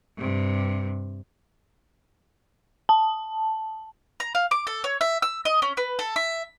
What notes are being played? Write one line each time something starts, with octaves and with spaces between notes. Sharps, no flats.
G2 C3
A5
A#5
F5
D6
A4
C#5
E5
E6
D#5
C#4
B4
A4
E5